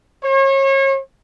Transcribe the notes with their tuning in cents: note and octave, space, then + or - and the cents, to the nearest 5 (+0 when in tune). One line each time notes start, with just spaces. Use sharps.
C#5 -35